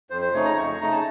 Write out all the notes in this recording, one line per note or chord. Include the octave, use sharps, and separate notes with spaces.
F2 C5
C5
C#3 A3 D#4 C#5
A#5
F2 C#6
C#3 A3 D#4 A#5
A5